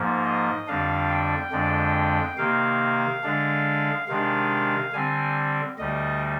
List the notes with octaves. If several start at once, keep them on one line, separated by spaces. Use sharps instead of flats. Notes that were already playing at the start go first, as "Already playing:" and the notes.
Already playing: G#2 F3 A#3
D#5
F2 D3 G3 D4 F5
G5
F2 D3 G#3 D4
C3 D#3 A#3 F5
D3 G#3 D4
C3 D#3 G#3 D4 F5
D3 G3 C4 G#5
D2 D3 G3 D#5